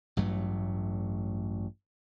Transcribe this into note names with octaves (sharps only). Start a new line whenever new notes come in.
A1 G2 F#3 A3